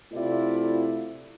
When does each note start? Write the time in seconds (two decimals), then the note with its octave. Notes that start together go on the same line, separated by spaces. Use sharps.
0.13 C3 A3 E4 F4 D5